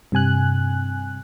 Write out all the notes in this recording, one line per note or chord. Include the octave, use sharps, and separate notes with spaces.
G2 C3 G#5 F#6